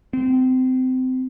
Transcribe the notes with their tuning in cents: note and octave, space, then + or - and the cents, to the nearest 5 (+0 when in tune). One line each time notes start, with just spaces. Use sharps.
C4 -25